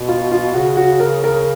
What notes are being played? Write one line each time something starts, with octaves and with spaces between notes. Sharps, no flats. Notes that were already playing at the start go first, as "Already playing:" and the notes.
Already playing: B2
F4
F4
C#3 F#4
F#4
A#4
A#4